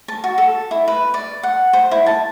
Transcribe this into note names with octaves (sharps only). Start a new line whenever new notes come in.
A5
F#4
A4
E4
B4
D5
F#5
C5
E4
A5